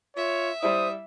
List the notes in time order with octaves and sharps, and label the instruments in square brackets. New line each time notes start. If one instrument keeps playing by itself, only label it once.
[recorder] F4 [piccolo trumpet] C#5 [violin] E5
[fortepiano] G3 E4 [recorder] C5 [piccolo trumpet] D#6